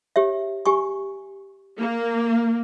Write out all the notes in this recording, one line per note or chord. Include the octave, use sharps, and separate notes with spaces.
G4 C#5 E5
G4 G#5 C#6
A#3